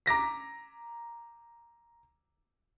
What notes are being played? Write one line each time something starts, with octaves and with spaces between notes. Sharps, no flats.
A#5 D6 A#6 B6